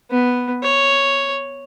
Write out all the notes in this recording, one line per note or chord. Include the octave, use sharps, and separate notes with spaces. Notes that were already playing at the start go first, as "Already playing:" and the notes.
B3
C#5